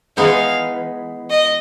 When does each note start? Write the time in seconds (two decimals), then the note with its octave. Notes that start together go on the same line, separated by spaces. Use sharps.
0.17 E3 G#3 B3 D#4 F5
1.30 D#5